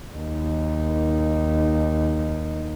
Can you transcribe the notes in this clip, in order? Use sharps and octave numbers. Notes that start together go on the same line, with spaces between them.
D#2 D#4